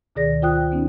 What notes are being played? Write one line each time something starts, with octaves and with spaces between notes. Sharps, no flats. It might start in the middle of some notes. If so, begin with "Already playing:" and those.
D2 B2 D#3 G#4 D5 A#6
F4 C5 G5 D#6 F#6
B3 C#4 D#4